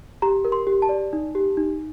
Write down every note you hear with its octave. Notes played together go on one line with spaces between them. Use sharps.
G4 A#5
A#4
C6
G4
A5
D5
D#4
G4
D#4